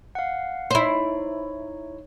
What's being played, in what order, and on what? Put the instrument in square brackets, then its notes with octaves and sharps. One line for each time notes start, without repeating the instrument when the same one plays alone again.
[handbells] F5 F#5
[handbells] D#4 C#5 [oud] E4 C5